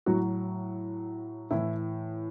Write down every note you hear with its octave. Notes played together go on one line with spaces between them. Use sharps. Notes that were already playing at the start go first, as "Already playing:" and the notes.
A2 F#3 F#4
A2 E3 E4